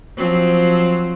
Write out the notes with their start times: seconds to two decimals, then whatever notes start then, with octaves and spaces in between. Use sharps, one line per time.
0.16 F3 F#3 C4